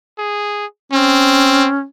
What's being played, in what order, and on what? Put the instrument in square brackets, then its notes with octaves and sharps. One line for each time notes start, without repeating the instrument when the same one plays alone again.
[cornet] G#4
[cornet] C4 [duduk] C#4